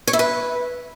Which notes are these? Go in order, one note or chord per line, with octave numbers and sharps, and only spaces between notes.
C#5
E4
B4